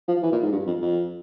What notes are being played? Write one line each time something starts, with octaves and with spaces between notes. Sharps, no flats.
F3
E3
A#2
G#2
G2
F2
F2